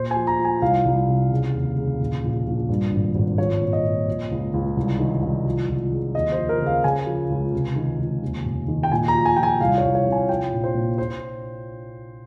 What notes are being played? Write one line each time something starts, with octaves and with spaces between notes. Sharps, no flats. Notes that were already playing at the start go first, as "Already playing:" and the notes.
Already playing: A#2 C5
G#5
F3
A#5
F3
G#5
C2 F5
C2
C3
C#3
D#2
C#3
A#1
A#1
A#1
G2
G#1
G#1
F3 C#5
A#2
D#5
A#2
F3
C#2
C#2
C2
D#3
C2
F3
C#2
C#3
D#2 D#5
C5
F3
A#4
C#3 F5
C#3 G#5
F3
C#2
C3
D#3
C#2
D#2
F1
D#3
G5
A#2 G#5
A#5
F3
G#5
F3 G5
G#5
C2 F5
C#5
C2
C#5
C3
G#5
F3 G5
A#1
C5
A#2
C5